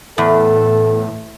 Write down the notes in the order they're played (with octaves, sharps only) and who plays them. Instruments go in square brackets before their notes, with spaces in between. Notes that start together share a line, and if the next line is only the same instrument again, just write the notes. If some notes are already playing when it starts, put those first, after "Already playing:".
[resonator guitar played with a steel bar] E2 [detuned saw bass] A2 [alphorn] A4